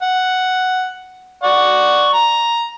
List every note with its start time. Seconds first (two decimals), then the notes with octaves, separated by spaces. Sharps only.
0.02 F#5
1.43 D5 F#5 C#6
2.14 A#5